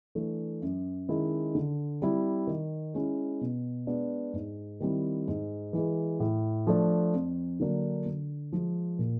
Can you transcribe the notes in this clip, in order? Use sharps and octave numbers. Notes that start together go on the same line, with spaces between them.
E3 A3 D4
F#2
D#3 G#3 C#4 E4
D3
G3 C4 E4
D#3
G#3 C#4 E4
B2
G#3 B3 D4
G#2
D#3 G3 C4 E4
G#2
E3 G#3
A2
F3 A3 D4
F2
D3 F#3 A#3 D4
D3
F3 G#3
A#2